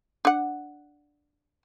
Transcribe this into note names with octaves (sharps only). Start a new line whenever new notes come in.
D4 F#5